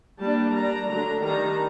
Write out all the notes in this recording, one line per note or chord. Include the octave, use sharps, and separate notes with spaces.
G3 A#3 D4 A5
G3 D4 A#5
D3 F#3 A3 D4 A#5
D#3 G3 D4 A#5